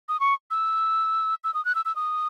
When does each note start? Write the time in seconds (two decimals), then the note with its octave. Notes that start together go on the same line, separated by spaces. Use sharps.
0.09 D#6
0.20 C#6
0.51 E6
1.44 E6
1.54 D#6
1.65 F#6
1.75 E6
1.85 E6
1.96 D#6